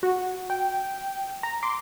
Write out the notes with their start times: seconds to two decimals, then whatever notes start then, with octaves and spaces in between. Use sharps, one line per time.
0.03 F#4
0.50 G5
1.43 A#5
1.63 C6 D6